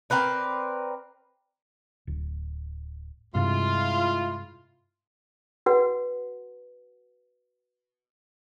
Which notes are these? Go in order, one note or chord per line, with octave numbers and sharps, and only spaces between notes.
C4 A#4 B4 D5
D1
G2 C3 G#3 E4 F4
F#4 B4 F#5